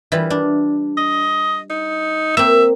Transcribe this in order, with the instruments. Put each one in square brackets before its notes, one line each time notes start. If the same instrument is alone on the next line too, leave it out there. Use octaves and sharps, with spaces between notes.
[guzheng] E3 G3 F4
D4
[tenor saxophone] D#5
D#4
[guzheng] A#3 C4 [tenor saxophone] E5